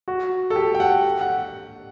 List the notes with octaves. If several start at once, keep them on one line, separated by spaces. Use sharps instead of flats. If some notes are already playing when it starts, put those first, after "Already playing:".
F#4
A4
G4
G5
F#5
F#5